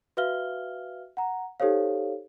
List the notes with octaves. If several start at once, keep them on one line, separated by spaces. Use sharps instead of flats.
F#4 B4 E5 F5 F6 G7
F#5 A#5
D#4 G4 A4 C5 C#5 F5